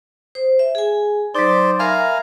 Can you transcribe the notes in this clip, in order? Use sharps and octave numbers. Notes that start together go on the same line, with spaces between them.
C5
E5
G#4 G#5
F#3 D#4 C5 D5
A#4 E5 F5 G#5 A#5 B5